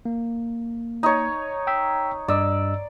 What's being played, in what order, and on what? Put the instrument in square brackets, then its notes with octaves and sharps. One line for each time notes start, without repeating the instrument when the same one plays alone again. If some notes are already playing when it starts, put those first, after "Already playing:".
[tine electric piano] A#3
[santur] D#4 C#5
[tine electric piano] G5 E6 B6
[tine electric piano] G2 D#5 E6 [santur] D5